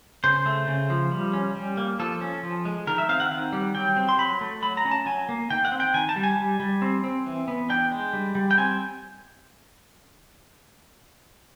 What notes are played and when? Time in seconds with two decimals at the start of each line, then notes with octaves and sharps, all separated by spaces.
0.24 C#3 C5
0.46 A3
0.68 C#3
0.90 F3
1.11 G3
1.33 C#4
1.55 G3
1.77 A#3
1.99 F3 A4
2.21 C#4
2.43 F3
2.65 G#3
2.87 D#3 A#4
2.98 E5
3.09 C4 F5
3.20 F#5
3.31 D#3
3.53 G3
3.75 F#3 G5
3.97 C4
4.09 C6
4.18 F#3 B5
4.41 A3
4.62 F#3 B5
4.77 A#5
4.85 C#4
4.91 A5
5.06 F#3 G#5
5.29 A#3
5.50 D#3 G5
5.65 F#5
5.72 C4
5.80 G5
5.94 D#3 G#5
6.09 A5
6.16 G3
6.23 G#5
6.38 G3
6.60 G3
6.82 C4
7.04 C4
7.26 E3
7.48 B3
7.70 D4 G5
7.92 G#3
8.13 G3
8.35 G3
8.51 G5
8.58 C4 G#5